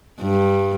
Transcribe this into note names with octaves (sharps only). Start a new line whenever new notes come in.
G2